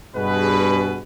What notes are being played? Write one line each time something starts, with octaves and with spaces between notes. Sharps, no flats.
G2 B2 G#4 B4